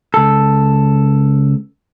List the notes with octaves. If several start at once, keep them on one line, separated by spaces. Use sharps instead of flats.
C#2 A4